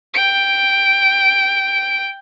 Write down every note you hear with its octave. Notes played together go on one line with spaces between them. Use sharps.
G5 D7